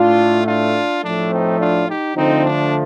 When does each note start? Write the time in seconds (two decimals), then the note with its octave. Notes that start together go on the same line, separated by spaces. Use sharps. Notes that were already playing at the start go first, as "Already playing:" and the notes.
Already playing: A2 A3 D4 F4
0.47 D4 F4
1.03 A2 F3 A3 D4
1.31 C4 D#4
1.60 D4 F4
1.88 D#4 G4
2.16 D3 F3 A3 C4 D#4
2.44 D4